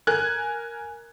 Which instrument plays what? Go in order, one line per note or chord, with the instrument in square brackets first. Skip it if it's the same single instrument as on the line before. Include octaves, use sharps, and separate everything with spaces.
[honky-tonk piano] A#4 G#5 F#6 G#6